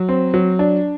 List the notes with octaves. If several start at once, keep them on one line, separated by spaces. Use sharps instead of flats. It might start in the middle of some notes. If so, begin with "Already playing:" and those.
Already playing: F#3
C4
F#3
D4